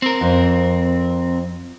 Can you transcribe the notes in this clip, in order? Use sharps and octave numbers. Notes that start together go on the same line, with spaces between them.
C4 A#4
F2